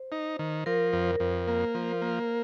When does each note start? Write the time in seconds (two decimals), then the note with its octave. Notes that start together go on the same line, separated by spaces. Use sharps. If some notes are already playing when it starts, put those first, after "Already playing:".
Already playing: C5
0.12 D#4
0.39 D#3
0.66 F3 A#4
0.93 F2
1.20 F2
1.47 A#3
1.75 F3
2.02 A#3